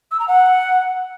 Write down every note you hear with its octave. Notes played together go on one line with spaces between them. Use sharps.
E6
A#5
F#5